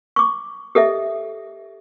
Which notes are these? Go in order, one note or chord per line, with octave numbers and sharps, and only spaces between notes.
C#6 D6
G4 A4 D#5 E5